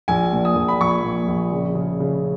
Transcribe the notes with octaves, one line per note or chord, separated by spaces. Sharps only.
A#1 G#5
A#2
D#6
A#1
B5
A#1 C#6
A#2
A#1
C#3
C#3
C#3